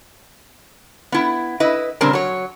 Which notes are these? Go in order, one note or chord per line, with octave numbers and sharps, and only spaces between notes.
B3 E4
E4 B4 D#5
A#2 C#3 G3 C4 D4 A#4
F#3 C#5